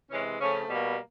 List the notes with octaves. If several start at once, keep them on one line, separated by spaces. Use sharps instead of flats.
C3 E3 G#3 C#4
C#3 F3 A3 C#4
B2 G3 A#3